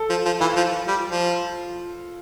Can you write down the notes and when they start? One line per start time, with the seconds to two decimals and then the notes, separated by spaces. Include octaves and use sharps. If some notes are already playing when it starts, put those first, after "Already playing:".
Already playing: A4
0.10 F3
0.25 F3
0.40 E3 F4
0.56 F3
0.87 G3
1.11 F3